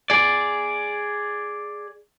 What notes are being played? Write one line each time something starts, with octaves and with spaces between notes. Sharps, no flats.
G#4 D5